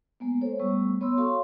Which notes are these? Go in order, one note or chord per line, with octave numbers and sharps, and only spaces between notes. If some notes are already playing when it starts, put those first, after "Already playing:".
G#3 A#3 B3
A4 C5 C#5
G3 A3 B3 C#6 E6
B3 C#5 B5 C6 E6
F#4 A4 C#5 F5 C6 C#6